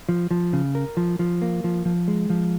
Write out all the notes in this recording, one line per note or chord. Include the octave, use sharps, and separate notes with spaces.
F3
F3
C#3
A#4
F3
F3
A#3
F3
F3
G#3
F3